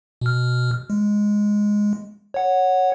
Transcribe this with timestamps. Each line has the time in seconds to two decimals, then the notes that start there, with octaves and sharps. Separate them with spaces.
0.21 B2 F6
0.90 G#3
2.34 C#5 F#5